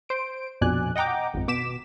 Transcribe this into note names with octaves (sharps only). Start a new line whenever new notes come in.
C5 D7
A#1 F2 B2 D5 G#5 F#6
D#5 F#5 G5 A#5 D6
G#1 F2
B2 D6 B6 E7